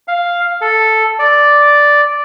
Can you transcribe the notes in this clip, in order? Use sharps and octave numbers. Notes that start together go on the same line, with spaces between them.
F5
A4
D5